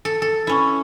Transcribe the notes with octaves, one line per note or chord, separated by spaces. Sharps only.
A4
A4
C#4 E4